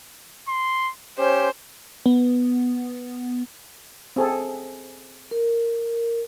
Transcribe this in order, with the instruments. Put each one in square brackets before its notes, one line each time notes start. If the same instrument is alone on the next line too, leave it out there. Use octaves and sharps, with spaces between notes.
[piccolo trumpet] C6
[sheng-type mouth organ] C#4 [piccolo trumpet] G4 [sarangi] C5
[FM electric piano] B3
[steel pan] C4 G#4 A4
[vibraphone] A#4